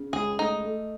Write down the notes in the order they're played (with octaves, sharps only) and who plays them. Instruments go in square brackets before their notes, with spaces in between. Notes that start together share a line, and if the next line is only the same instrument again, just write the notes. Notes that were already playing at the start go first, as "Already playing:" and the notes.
Already playing: [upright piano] C#3
[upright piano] C#2 [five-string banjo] G#4
[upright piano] A3 [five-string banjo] D#4
[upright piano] A3